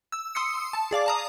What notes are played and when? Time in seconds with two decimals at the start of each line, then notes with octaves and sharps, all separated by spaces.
0.12 E6
0.35 C6 D#6 E6 C#7
0.73 A5
0.91 G#4 D5 F5 D6
1.06 A5 A#5 D#6